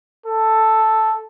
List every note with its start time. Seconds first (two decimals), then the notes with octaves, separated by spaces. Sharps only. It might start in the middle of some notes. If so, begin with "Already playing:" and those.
0.26 A4